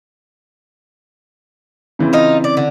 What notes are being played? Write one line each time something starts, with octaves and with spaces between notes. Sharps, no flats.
C#3 E3 C4
D#4 F4
D5
D3